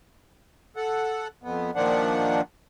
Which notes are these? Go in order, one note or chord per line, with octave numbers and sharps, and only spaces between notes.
A4 F#5
F2 B3
A#2 D#3 F3 D4 F#5